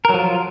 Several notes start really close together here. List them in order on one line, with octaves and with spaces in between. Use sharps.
A#4 F#3 F3 F4